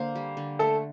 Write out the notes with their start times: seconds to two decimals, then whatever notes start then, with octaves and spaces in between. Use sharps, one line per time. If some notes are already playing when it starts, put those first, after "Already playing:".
Already playing: D3 A#3 C5
0.15 G3
0.37 D3
0.59 A3 A4